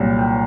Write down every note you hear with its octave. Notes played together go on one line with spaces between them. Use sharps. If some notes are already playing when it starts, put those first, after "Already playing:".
Already playing: C2 A#2 F#3
G5